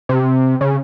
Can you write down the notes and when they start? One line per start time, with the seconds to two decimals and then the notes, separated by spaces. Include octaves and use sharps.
0.09 C3
0.61 C#3